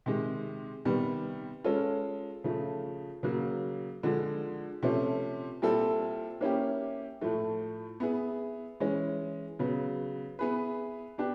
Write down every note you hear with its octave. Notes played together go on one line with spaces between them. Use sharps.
C3 D#3 G#3
C3 D#3 G3 B3
G#3 C#4 F4 A4
C#3 F3 A3
C#3 F#3 A#3
D3 F3 G#3
C3 F3 A3 C#4
A#2 G3 C4 E4 A4
A#3 C#4 E4 G4
A2 F3 A3
B3 E4 G#4
E3 G#3 C#4
C#3 F#3 B3
B3 E4 G#4 B4
B3 D4 G4